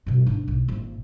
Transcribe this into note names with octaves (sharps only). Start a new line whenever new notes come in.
G2 B2
G#2 D4
B1
G#1 A#2